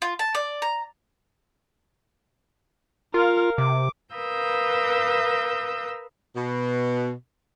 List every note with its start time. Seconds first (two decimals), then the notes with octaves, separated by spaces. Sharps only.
0.02 F4
0.19 A5
0.35 D5
0.62 A#5
3.14 F4 A#4 F5
3.58 C3 D6
4.13 A#4 B4 F5 D#6 E6 G6
6.35 B2